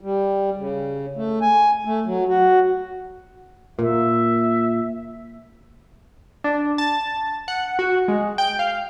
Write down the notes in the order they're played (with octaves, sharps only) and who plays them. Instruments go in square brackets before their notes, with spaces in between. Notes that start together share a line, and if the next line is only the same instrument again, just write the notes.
[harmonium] G3
C#3
A3
G#5
A3
F#3
F#4
[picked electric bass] A#2 [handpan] A#3 [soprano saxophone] E5
[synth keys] D4
A5
F#5
F#4
G#3
G5
F5